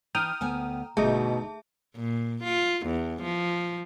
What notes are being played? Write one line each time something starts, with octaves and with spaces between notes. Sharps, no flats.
E3 D4 G5 A#5 D#6 F6
D2 B3 G#5
G1 B2 A3 D#4 G#4 E5 A5
A#2
F4
E2
F3